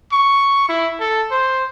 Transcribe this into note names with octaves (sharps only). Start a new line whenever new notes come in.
C#6
E4
A4
C5